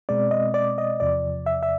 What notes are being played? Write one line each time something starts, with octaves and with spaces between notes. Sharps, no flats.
B2 G#3 C4 D5
D#5
D5
D#5
E2 C3 F3 D5
E5
E5